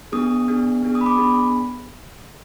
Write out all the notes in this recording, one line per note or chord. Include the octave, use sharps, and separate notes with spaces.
B3 D4 G#4 D#6
B3 D4 G#4
B3 D4 G#4
D#6
B5
D6
B3 D4 G#4 B5